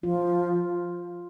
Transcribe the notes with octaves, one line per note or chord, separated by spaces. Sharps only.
F3 F4